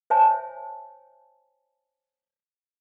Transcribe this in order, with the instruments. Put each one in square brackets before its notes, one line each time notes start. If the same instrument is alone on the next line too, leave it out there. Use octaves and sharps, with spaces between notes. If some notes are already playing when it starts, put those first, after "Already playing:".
[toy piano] C5 C#5 E5 G#5 A5